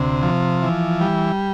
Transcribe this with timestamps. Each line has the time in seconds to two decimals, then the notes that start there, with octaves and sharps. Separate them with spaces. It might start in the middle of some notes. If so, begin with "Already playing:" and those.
Already playing: D2 C3
0.23 F3
0.62 E3
1.01 G3